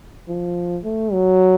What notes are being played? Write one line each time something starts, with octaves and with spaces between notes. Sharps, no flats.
F3
A3
F#3